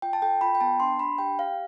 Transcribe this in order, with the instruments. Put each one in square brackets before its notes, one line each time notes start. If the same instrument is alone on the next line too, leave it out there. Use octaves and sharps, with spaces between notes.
[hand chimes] F4 G5
A5
A4 G5
F4 B5
G5
B3 A5
D4 C6
D4 B5
G4 G5
G4 F5